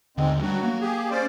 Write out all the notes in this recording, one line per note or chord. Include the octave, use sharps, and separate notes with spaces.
D#2 G#2 D3 G#3 C4
F#3 G3 D4 F#4
A#3
G4 G#4
C#4 C5 D5